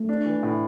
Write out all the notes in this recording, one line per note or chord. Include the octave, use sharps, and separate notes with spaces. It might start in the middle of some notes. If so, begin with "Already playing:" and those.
Already playing: A3
D4
E3
A2